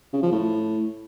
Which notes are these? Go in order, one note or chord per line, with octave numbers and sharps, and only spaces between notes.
C#3
F3
A2